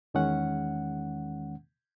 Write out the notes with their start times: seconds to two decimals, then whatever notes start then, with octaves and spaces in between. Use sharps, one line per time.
0.14 E2 D#3 G#3 C#4 F#5